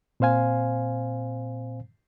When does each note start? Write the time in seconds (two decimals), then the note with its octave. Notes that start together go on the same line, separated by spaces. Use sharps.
0.20 A#2 C4 C5 F5 G#5